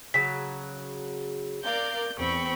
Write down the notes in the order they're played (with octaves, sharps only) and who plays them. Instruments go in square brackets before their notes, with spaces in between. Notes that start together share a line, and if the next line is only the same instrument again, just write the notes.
[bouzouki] C#3 F#3 [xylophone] B6
[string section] A#4 D5 F5 [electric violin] G6
[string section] E2 C4 C#6 [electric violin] G5 B5